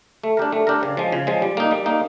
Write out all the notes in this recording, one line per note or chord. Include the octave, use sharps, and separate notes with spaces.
A3
D4 G4 A#4
A3
D4 G4 A#4
C#3
F3 G#3
C#3
F3 G#3
G3
A#3 D#4
G3
A#3 D#4